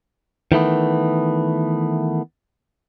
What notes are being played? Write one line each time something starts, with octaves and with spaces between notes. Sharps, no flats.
D#3 E3 A3 B3